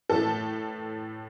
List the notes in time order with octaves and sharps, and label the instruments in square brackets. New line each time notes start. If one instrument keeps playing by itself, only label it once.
[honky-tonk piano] A2 E3 A3 A4 A5